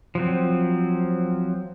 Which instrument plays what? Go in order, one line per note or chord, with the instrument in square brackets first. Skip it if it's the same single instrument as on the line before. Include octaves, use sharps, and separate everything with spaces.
[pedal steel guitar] F3 F#3 C4